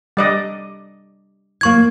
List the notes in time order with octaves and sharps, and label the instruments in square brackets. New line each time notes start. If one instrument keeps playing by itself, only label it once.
[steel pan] G3 D5 D#5
[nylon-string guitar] E3 A#3 [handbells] C#6 G#6